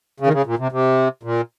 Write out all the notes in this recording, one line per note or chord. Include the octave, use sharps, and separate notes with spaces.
C#3
D#3
C#3
A#2
C3
C3
A#2